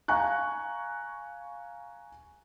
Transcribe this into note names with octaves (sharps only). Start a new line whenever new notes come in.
F5 G#5 A#5 C#6 F#6